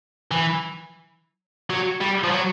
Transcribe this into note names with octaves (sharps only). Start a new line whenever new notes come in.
E3
F#3
G3
F3
F#3